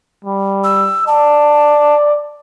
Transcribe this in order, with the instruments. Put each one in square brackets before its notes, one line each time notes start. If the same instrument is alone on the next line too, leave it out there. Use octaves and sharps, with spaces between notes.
[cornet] G3
[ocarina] E6
[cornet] D5 [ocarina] A5